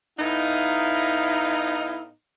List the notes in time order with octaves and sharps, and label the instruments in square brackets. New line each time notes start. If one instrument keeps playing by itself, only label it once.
[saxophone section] A2 B3 D#4 [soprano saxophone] E4 [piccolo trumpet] F5